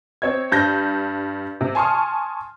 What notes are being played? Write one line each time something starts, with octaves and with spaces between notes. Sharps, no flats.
C4 C#5 D#5 G#6
G2 G6 A#6
C3
G#5 A5 C6 C#6 D#6 F6